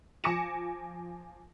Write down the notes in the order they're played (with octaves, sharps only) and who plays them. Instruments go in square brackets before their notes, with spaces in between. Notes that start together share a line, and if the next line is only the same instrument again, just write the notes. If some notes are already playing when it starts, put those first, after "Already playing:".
[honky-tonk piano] F3 G#5 D6 A#6 C#7 E7